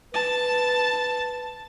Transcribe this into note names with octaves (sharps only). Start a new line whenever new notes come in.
B4 A5